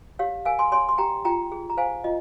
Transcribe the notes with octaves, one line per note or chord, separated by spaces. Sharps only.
G4 C#5 F5
A#4 F5 G#5
G#5 C6
C#5 G#5 C6
C6
G4 G5 A#5
F4 G5 A#5
G#4
A#5
C5 F5 G#5
F4 D#5